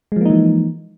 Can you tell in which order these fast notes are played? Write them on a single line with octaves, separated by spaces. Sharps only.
G#3 F3 A#3 D#4 E3